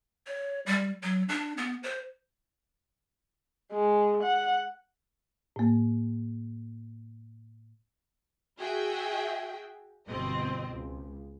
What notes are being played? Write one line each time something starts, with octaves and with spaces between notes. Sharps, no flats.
C#5
G3
F#3
D4
B3
C5
G#3
F#5
A2 A#3
F#4 G#4 E5 G5
G1 B2 C4 D#5
C#2